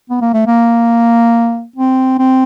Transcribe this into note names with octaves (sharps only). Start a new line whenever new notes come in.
B3
A#3
A3
A#3
C4
C4